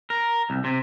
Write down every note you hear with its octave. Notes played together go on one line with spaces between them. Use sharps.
A#4
C2
C3